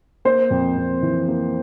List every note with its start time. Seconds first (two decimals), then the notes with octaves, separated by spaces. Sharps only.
0.25 A#3 C5
0.51 F2
0.77 F2
1.02 E3
1.28 A#3